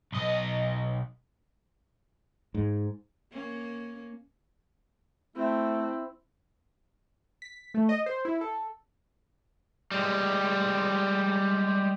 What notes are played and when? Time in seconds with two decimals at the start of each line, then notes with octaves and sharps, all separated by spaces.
0.12 B1 D#5
2.54 G#2
3.32 A#3 C#4
5.36 A3 C4 E4
7.42 B6
7.74 A3
7.89 D#5
8.06 C5
8.25 E4
8.41 A4
9.92 G3 G#3